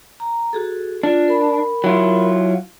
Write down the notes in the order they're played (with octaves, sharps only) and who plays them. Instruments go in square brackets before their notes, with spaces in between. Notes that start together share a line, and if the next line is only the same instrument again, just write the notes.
[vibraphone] A#5
F#4 G#4 A4
[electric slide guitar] D4 [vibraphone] F4
[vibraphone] A#4 B5
[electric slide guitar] F#3 E4 F4